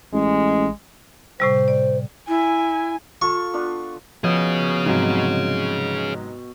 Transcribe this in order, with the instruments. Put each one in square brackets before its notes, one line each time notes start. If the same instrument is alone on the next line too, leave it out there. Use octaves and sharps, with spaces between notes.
[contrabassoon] A1 [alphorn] G#3
[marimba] A2 C3 G3 [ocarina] C5
[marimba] D5
[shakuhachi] E4 [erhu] G#5
[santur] F4 A4 [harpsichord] C#6
[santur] B3 D4 F4
[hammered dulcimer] B2 [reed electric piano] F3 [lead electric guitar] G#4 C#5
[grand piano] G#2 C3 F#3